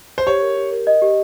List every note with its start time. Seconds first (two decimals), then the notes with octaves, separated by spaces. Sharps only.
0.18 C5
0.27 G4 C#5
0.42 A#4
0.57 G4
0.72 A#4
0.87 D#5
1.02 G4